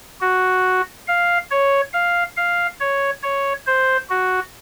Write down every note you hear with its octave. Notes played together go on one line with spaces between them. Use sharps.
F#4
F5
C#5
F5
F5
C#5
C#5
C5
F#4